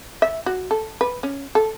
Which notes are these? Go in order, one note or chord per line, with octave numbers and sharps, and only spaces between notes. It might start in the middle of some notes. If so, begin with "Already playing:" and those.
E5
F#4
A4
B4
C#4
A4